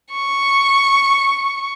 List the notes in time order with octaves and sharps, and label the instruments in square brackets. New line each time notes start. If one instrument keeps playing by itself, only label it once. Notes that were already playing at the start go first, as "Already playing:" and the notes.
[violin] C#6